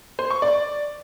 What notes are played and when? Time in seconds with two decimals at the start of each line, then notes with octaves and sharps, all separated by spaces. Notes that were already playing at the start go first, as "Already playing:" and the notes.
0.19 C5
0.30 C#6
0.42 D5